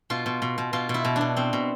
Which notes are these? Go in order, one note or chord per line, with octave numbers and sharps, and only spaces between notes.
B2 F4
B2
B2
B2
B2 F4
B2
E4
B2
D4
B2
B2 C4
B2